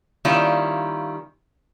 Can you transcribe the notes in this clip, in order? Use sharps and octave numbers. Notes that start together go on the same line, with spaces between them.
D#3 G3 A#3 C#4 E4 F4